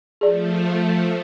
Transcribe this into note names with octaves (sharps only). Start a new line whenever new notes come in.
F3 A3 G#4 D5